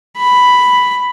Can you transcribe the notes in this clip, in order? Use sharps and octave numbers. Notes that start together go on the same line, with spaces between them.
B5